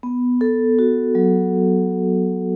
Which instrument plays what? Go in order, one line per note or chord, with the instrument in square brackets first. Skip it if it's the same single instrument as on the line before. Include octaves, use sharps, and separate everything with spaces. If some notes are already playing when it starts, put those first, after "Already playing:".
[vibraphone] B3
A4
F#4
F#3